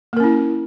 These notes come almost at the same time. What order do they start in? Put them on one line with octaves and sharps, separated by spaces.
A#3 A#4 C#4 E4